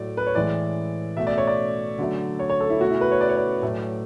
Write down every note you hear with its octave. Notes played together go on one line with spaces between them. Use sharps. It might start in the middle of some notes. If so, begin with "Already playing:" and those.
Already playing: A2 F#3 A3 D5
B4
C#5
A2 E3 G#3 D5
B2 A3 E5
D5
C#5
D5
D3 F#3 A3
C#5
C#5
A4
E4
B2 A3 F#4
E4
B4
C#5
D5
C#5
D5
A2 F#3 A3